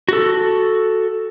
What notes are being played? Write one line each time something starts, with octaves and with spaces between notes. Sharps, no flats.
F#4 A4